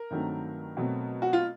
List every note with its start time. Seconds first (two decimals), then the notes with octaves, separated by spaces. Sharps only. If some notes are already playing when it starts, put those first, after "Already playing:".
Already playing: A#4
0.10 G2 D#3 F#3 A3 C4
0.77 B2 F#3 A3 C4
1.22 F#4
1.33 F4